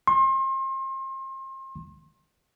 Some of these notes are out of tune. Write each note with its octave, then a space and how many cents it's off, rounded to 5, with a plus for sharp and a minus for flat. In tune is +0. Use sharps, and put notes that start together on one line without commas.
C6 +35